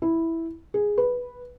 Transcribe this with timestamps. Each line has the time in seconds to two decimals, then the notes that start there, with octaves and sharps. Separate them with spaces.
0.02 E4
0.74 G#4
0.98 B4